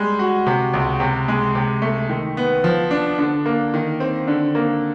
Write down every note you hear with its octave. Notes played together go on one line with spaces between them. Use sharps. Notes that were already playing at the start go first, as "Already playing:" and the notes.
Already playing: G3 G#3
F#4
C3
C#2
C3
G#3
C3
A3
D#3
B3
F3
D4
D3
A#3
D#3
C4
D3
A#3